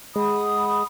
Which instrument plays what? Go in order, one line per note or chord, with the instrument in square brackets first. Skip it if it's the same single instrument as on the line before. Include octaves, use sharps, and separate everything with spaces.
[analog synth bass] G#3 [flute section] F#5 B5 D#6